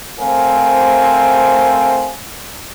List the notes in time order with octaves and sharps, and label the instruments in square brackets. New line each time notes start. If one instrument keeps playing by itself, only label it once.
[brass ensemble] A3 C4 A#4 C5 F5 G#5